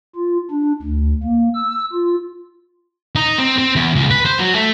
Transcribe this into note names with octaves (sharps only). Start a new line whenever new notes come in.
F4
D4
D2
A#3
E6
F4
D#4
C4
C4
E2
C#2
B4
C5
F#3
A3